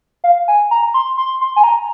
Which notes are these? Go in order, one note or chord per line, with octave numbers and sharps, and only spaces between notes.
F5
G#5
A#5
C6
C6
C6
G#5
A#5